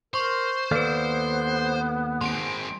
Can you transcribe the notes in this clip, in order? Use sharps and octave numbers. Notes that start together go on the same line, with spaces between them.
A#4 C5 C6 C#6
D#2 B3 A4 B4 D5 F5
G#3 C4 C6 D7